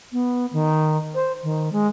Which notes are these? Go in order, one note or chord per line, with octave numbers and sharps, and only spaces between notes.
B3
D#3
C5
D#3
G#3